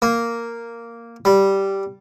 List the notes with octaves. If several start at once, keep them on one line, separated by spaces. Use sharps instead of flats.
A#3
G3